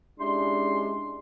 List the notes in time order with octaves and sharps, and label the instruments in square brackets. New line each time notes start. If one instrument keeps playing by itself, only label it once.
[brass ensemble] G#3 C#4 D4 [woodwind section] E4 G4 C6